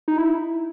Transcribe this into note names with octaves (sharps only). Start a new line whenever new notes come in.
D#4
E4